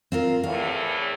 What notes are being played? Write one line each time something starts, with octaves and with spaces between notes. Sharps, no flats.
C4 F4 A#4
E2 A2 F5